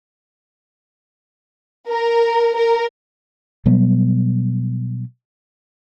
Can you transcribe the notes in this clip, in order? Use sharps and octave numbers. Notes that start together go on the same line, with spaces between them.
A#4
A#4
B2 F#3 G3 B3